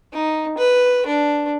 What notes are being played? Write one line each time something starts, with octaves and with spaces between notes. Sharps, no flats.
D#4
B4
D4